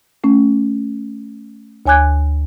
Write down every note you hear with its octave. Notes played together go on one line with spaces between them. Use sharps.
A3 C#4
D2 C#5 G#5 D6 F#6 G#6